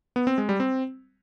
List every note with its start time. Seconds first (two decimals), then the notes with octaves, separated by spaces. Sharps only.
0.16 B3
0.27 C4
0.38 G#3
0.49 G3
0.60 C4